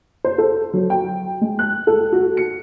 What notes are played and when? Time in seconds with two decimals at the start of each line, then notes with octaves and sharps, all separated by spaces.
0.24 C5
0.38 A4
0.73 F#3
0.90 G5
1.41 G#3
1.59 F#6
1.87 A4
2.12 F#4
2.37 C#7